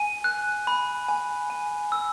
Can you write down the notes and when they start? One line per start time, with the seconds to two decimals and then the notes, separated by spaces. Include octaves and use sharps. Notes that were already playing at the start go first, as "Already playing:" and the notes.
Already playing: G#5 D#7
0.24 F#6
0.67 B5
1.08 G#5
1.50 G#5
1.92 E6